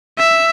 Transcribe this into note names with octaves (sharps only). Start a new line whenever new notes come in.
E5